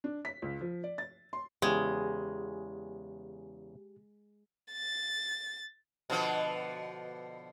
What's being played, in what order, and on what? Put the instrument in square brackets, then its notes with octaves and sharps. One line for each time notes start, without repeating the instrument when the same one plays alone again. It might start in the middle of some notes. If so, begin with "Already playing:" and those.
[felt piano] D4
B6
C#2
F3
D5
A6
C6
[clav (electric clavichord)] E2 C#3 [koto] G#3 [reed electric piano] G4
[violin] A6
[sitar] B2 D3 F3